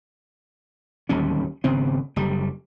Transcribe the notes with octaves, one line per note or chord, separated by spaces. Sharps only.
D1 D#2 G3 C#4
G#1 C#3 B3 C4
F#1 G3